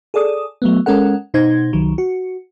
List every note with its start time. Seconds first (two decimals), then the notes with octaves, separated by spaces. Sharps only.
0.14 G#4 A4 D5 D#6
0.62 F#3 A3 B3
0.86 G#3 C#4 A4 A#4 F#5
1.34 B2 D#4 C5 G#6
1.73 C2 D#3 F#3
1.98 F#4